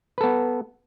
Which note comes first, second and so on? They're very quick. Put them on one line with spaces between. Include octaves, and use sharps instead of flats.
B4 A4 B3